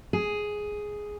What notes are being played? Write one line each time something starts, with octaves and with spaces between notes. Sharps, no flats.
G#4